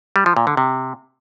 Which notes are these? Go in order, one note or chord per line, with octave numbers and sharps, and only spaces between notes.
G3
F3
A#2
D3
C3